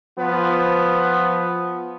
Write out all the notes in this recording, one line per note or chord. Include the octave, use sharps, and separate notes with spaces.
F3 B3